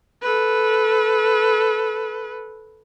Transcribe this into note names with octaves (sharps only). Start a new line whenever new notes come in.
A4 B4